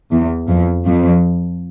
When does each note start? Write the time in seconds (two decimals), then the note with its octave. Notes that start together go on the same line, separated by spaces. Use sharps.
0.12 E2
0.49 F2
0.85 F2